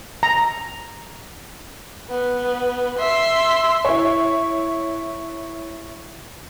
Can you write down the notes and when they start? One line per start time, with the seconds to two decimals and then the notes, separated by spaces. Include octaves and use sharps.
0.23 A#5
2.11 B3
2.99 E5 C6
3.85 E4 C#5